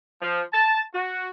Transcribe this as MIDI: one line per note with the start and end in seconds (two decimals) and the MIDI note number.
0.21 0.41 53
0.53 0.81 81
0.94 1.29 66